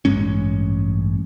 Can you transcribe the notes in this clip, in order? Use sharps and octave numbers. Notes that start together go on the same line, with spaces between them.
A1 G2 G#3 C#4